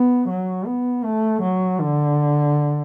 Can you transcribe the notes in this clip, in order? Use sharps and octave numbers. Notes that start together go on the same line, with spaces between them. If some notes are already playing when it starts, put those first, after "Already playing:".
Already playing: B3
F#3
B3
A3
F#3
D3